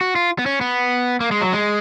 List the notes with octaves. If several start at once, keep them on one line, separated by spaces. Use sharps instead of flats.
F#4
F4
B3
C#4
B3
A#3
G#3
F#3
G#3